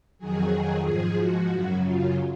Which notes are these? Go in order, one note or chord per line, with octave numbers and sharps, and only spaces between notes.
F2 D#3 F#3 G#4
G#2 F3 G#4
F#4
F#2 C#3 F#3
F4